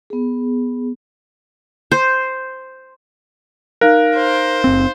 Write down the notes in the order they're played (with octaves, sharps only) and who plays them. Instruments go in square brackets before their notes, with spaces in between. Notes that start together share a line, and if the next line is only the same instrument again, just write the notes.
[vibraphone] B3 G#4
[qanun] C5
[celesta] D#4 F5 F#6 [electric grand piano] A#4
[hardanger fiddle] C5
[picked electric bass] F#1 C4